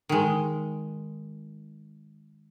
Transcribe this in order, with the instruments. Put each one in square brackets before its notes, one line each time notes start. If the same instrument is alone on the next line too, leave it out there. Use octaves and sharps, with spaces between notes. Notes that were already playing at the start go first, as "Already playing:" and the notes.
[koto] D#3 G#3